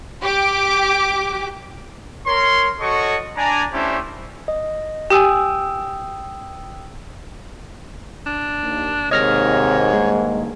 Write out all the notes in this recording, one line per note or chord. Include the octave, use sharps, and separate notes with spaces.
G4 D6
A#4 C#5 C6
F#4 A4 C#5 D#5 C#6
D4 G#5 A#5
A3 C#4 D4 E4 G4 C5
D#5
G4 G5 G#5 D#6 E6
D4
D#2
D#2 G#2 C3 C#5 D#5 F6 A#6
G2 D#3 G#3 A#3